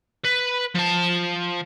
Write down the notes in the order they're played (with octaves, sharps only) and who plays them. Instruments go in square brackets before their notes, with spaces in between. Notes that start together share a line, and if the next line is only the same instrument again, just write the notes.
[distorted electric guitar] B4
F3 A5